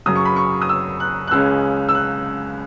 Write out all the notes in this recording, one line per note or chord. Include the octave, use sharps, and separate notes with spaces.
F#2 C#3 F#3 D#6
C#6
B5
C#6
D#6
E6
F#6
F#6
C#2 C#3 G#3 C#4 E6
E6
F#6